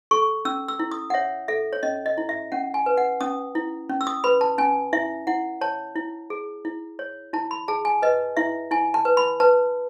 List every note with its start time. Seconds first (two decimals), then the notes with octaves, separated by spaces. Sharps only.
0.11 A4 C#6
0.45 C#4 E6
0.68 E6
0.79 E4
0.92 D#6
1.10 F#5
1.14 C#5 E5
1.48 A4 E5
1.73 C#5
1.83 C#4 D#5
2.06 D#5
2.18 E4
2.29 E5
2.52 C#4 F#5
2.74 G#5
2.86 B4
2.97 F#5
3.21 C#4 D#6
3.55 E4
3.89 C#4
4.01 E6
4.07 D#6
4.24 B4 B5
4.41 A5
4.58 C#4 G#5
4.93 E4 E5
5.27 E4 F#5
5.61 C#5 A5
5.96 E4
6.30 G#4
6.65 E4
6.99 C#5
7.33 E4 A5
7.51 B5
7.68 G#4 A5
7.85 G#5
8.02 B4 D#5
8.37 E4 E5
8.71 E4 G#5
8.94 A5
9.05 B4
9.17 B5
9.40 B4 A5